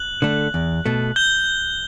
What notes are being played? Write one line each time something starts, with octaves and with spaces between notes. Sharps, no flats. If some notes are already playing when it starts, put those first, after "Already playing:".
Already playing: F#6 F#7
D3 A3
E2
B2 A3
G6 G7